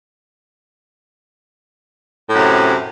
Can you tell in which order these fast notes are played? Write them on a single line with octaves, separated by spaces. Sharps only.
A2 F#2 C3